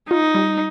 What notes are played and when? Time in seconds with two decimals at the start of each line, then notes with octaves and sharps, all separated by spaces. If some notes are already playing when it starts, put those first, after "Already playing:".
0.10 D#4 F4
0.35 G3